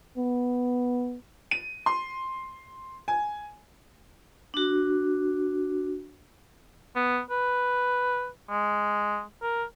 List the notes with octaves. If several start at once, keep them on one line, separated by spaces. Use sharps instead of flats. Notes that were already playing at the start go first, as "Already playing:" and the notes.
B3
D#7
C6
G#5
D4 F#4
B3
B4
G#3
A#4